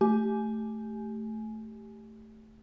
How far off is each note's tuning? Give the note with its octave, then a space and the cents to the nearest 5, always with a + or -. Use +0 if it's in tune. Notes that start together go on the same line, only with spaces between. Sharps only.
A3 +0 G4 +0 G#5 +15